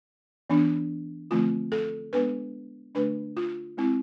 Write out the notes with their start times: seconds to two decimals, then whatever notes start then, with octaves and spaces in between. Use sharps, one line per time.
0.50 E3 B3 D4
1.31 D3 F3 A3 C4 F4
1.72 A4
2.13 G#3 B3 D4 B4
2.95 D3 A3 D4 B4
3.37 F4
3.77 G#3 C4 E4